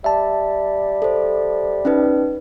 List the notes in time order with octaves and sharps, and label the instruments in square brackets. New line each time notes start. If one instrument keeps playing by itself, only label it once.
[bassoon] G3 [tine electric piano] E5 A5
[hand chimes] A4 C5
C#4 D#4 B4